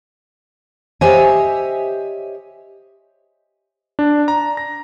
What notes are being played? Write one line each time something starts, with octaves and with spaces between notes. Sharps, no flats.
G4 C5 C#5 D#5 E5 G#5
D4
A#5
A#6